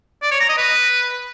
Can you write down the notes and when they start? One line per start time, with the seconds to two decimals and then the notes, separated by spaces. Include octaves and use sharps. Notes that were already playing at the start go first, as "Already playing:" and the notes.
0.23 D5
0.31 C#5
0.40 A#5
0.49 D#5
0.58 B4